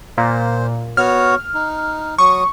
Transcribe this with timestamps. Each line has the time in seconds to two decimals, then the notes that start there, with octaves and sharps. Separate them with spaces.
0.17 A#2 C5
0.97 B3 F#4 C#5 F6
1.54 D#4
2.18 F#3 C#6 D#6